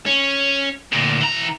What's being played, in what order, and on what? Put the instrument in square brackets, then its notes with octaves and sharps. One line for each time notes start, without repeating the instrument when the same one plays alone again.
[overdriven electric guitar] C#4
D2 A#2
E3 A#5